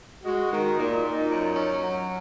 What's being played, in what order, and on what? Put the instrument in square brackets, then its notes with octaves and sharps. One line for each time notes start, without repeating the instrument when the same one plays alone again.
[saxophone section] G#3 [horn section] F#4
[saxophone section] D#3
[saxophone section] A#2 [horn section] D#4
[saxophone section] A#2
F#2
C#4
F#3